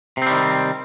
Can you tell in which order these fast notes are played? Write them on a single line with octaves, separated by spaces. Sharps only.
C3 C4 G3 D#3